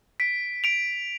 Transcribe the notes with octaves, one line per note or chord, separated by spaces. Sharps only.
B6 D7
D7 F7